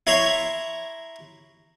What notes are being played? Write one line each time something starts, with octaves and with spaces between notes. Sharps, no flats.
E4 C#5 A#5 C6 C#6